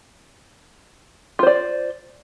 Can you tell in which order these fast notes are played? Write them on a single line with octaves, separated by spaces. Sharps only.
F4 C5 D5